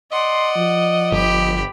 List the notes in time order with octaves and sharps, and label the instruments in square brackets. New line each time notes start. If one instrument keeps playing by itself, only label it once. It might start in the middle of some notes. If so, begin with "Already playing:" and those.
[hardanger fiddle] D5 F#5 [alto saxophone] D#5 [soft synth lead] C6
[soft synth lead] F3
[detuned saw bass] G1 [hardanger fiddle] G4 B5